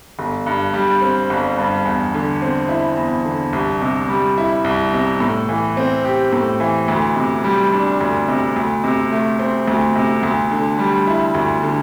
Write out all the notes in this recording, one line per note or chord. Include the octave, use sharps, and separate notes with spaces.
G1
G2
G3
C4
G1
G2
E2
D3
C4
E4
E2
D3
C2
C3
G3
E4
C2
C3
A2
E3
C4
G4
A2
E3
D2
C3
G3
D4
D2
C3
D2
C3
A3
C4
D2
C3
D2
D3
G3
E4
D2
D3